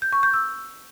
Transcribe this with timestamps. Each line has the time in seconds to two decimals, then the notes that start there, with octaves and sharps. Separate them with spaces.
0.02 G6
0.13 C#6
0.23 G6
0.34 E6